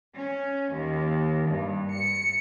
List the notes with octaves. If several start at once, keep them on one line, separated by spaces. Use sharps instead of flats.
C#4
D#2
G2
C#7